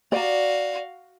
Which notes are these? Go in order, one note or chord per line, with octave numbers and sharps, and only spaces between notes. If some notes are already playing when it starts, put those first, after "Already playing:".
F#4 D5 F5 A#5